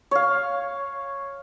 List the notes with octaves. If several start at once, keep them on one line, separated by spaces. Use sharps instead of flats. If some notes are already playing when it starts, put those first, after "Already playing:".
C#5 F5